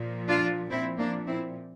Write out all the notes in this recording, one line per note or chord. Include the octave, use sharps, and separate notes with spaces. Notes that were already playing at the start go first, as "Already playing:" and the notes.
Already playing: A#2 F3
D4 F4
A#2 F3 C4 E4
A#3 D4
C4 E4